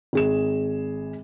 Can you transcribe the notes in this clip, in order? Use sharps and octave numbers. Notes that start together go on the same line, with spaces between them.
G#1 G#4 E7